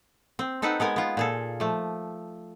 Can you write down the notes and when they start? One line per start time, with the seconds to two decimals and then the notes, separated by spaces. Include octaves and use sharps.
0.39 C4
0.62 C4 D#4 A4 B4 F#5
0.80 G#3 B3 A#4 G#5
0.96 B3 F4
1.17 A#2 G#4 A4
1.60 F3 A3